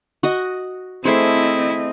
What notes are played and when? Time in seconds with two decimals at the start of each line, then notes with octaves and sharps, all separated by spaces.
0.23 F#4 D#5
1.05 A3 C4 E4 G#4 C5 D#5